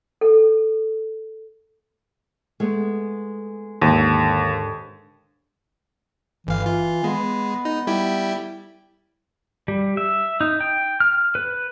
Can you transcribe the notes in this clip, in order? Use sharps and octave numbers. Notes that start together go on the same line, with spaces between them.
A4
G#3 A3 B3
D#2 G#2 D3
G1 E3 F5
F4
G#3 B3
D#4
G3 E4 G4
G3
E5
D#4
G5
F6
B4